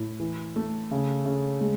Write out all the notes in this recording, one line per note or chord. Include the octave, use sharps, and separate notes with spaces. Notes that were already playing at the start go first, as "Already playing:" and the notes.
Already playing: A2
E3
A3
C#3
C#3
G#3